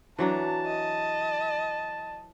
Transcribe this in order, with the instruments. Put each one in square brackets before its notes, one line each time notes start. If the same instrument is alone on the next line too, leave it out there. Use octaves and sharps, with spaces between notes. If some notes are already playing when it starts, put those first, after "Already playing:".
[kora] E3 F#3 D4 [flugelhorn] A5 [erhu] A#5
[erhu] D#5